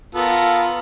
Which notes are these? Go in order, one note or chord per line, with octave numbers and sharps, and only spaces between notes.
B3 F4 A4 A#4